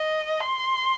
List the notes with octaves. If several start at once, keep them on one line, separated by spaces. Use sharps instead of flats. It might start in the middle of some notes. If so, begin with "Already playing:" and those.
Already playing: D#5
C6